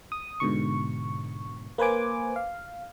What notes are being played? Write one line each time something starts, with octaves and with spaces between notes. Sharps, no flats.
D#6
G#2 B2 D3 C#6
A#3 B4 C5 G#5 D6
F5